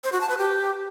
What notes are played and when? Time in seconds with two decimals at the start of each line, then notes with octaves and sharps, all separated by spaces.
0.04 C5
0.12 F#4
0.21 A5
0.29 B4
0.38 G4